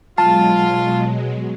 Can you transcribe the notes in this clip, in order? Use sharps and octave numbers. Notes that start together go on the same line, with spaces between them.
B2 F#3 G#3 F4 A5